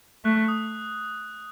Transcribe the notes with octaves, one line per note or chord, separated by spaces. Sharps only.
A3 F#6
D#6